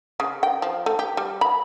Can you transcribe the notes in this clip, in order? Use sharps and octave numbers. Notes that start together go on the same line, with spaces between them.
C#3
G5
F3
A3
G4
G3
B5